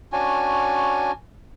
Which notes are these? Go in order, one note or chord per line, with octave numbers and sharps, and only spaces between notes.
C#4 D4 F#4 G#5